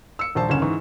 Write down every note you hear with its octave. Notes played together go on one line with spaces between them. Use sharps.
E6 C#7
D#1 A#1 C5 A5
F#1 D2 C#4 E7
G#2 E3 C#6